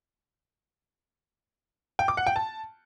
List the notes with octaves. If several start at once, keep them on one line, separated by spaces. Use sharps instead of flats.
G5
D6
F#5
G5
A5